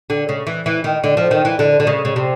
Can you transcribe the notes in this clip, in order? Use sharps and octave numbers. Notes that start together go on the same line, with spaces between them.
D3
C#3
E3
E3
D#3
D3
F3
D#3
E3
D3
D3
C#3
C#3
C3